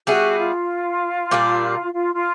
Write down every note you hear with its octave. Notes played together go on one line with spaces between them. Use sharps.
G3 B3 E4 F#4 G#4
F4
A#2 G3 A#3 D4
F4
F4